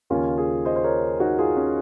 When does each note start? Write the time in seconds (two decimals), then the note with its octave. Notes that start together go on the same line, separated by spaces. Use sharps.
0.10 D#2 C#3 C#4 F4
0.37 F4 G#4
0.65 C5 D#5
0.76 C5
0.84 A#4 C#5
1.20 D#4 F#4
1.38 F4 G#4
1.56 C#4